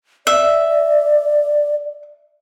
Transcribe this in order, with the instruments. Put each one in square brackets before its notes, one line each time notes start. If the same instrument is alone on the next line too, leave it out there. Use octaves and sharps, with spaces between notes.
[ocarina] D5 [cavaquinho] E5